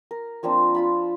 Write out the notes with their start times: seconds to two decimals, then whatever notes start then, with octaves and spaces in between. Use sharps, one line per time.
0.11 A#4
0.43 F3 A#3 C4 D4
0.75 F4 A5 B5